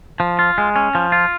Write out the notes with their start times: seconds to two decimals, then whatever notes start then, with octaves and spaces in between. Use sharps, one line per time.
0.20 F3
0.39 F4
0.58 G#3
0.76 C#4
0.95 F3
1.12 F4